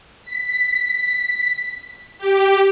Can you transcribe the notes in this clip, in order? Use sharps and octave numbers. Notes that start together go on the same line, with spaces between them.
B6
G4